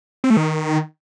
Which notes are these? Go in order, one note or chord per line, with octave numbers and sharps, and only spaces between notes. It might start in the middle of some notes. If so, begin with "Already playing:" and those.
C4
A3
D#3